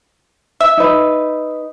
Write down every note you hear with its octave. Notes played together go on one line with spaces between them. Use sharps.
E5
D#4 B4